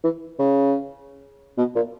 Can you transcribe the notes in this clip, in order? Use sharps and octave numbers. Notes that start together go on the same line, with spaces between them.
E3
C#3
B2
A#2